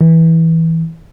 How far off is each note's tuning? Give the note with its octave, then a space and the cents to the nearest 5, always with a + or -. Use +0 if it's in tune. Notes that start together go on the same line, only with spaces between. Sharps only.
E3 -15